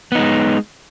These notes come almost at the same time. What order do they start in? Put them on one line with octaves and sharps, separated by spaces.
B3 D#4 G#3